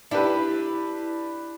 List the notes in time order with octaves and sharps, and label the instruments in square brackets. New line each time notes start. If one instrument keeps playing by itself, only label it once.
[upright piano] D4 G4 B4 [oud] E4